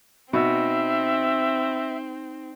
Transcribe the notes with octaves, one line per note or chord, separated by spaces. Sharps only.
B2 C4 D#4 E5